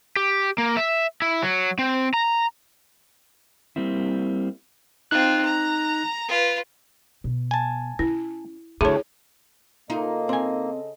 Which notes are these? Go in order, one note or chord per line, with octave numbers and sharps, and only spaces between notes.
G4
A#3
E5
E4
F#3
C4
A#5
G3 A#3 C4 E4
C4 D#4 F4 F#6
A#5
F4 B4
B2
G#5 A5
C#4 E4
D2 G2 A3 E4 G#4 C#5
C#3 A#3 D#4 F4 A4 D#5
C4 G#5